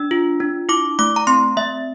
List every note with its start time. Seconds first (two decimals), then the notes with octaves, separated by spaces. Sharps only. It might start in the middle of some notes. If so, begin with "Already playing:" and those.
Already playing: D4 E6
0.11 F4
0.40 D4
0.69 E4 D6
0.99 A3 D6
1.16 A#5
1.27 C4 C6
1.57 A3 E5